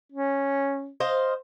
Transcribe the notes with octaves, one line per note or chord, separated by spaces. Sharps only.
C#4
C5 D#5 F5